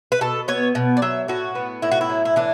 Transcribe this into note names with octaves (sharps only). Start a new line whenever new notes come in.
B4
B2 A4
B3 C#5
B2
D5
F#3 E5
A2 F#4
B3
A2 E4
F#4
E4
F#3
E4
E3 D4